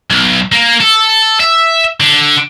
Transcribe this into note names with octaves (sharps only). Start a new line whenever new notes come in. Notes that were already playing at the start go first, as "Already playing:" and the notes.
B1
A#3
A4
E5
D3